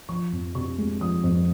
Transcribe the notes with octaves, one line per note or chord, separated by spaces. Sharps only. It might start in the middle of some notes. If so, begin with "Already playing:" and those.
F3 C#6
F2
C3 C#6
G#3
F3 D#6
F2